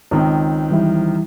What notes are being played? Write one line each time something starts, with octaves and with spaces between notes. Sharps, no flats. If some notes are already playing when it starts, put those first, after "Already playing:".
C#2 D#3 C4
E3 G3 E4